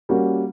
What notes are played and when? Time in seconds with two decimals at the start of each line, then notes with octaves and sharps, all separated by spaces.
0.09 G3 A#3 C#4 F#4 A#4